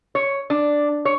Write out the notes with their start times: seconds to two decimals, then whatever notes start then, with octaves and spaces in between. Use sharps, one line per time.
0.15 C#5
0.50 D4
1.05 C#5